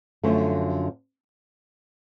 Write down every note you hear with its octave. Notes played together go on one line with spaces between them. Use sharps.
F#2 D3 F3 A3